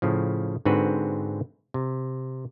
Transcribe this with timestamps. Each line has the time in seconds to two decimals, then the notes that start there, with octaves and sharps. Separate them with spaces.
0.02 A2 C#3 F3
0.65 G#2 D3 C4 F#4 B4
1.74 C3